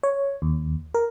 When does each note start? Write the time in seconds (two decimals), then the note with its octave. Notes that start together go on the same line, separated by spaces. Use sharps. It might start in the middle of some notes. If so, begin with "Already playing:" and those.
0.03 C#5
0.42 D#2
0.94 A#4